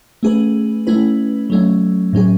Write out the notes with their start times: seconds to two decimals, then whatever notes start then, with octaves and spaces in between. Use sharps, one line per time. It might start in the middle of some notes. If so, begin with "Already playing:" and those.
0.23 A3 C#4 G#4 B4
0.87 A3 C#4 E4 B4
1.50 F#3 A3 C#4
2.13 A2 F#3 C#4 G#4